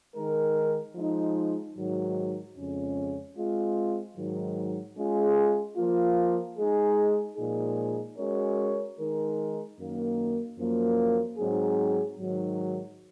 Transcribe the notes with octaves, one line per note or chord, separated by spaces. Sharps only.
D#3 G#3 D#4 A#4
F3 G#3 D#4
G#2 D#3 F#3
F2 C#3 G#3 C#4
G#3 C4 F4
G#2 D#3 F#3
G#3 C#4 F4 G#4
F3 A#3 F4
G#3 D#4 G#4
A#2 F3 G#3 D#4 G#4
G#3 C#4 F#4 A#4 C#5
D#3 G#3 D#4 A#4
F#2 D#3 A#3
F#2 F3 A#3
G#2 F#3 C4 D#4 G#4
G#2 D#3 F#3